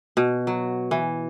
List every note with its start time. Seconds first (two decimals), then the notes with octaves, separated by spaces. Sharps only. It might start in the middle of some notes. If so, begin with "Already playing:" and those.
0.17 B2
0.47 F#3
0.91 E3